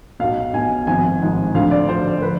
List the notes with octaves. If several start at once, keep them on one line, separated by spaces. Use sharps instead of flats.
B1 B2 F5
B1 B2 G#5
G#1 G#2 F3 G#5
G#1 G#2 F3
D2 D3 F3 F5
D5
D2 D3 F3 C5
F3 B4